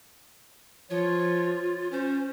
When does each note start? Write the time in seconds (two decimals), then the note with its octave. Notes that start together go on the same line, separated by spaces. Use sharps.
0.90 F3 F4 C#5
1.92 C#4 C5